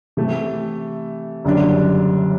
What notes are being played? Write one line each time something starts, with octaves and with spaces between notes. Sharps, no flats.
C3 E3 A3
F#1 F#2 D3 G3 D4